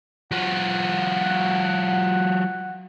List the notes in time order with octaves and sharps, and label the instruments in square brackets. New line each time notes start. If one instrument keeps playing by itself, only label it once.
[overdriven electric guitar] F#3 F4 [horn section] F#5